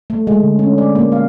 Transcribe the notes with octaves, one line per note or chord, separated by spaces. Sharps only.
A3
G#3
D3
C#4
D5
A#3
F5